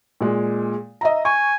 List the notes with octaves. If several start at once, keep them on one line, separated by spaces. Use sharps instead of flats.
A#2 G#3
D#5 E5 A#5
G#5 C#6